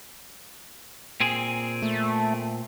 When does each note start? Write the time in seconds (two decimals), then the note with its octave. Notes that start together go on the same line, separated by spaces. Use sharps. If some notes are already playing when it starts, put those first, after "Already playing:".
1.20 A#2 C4 G#4
1.82 A3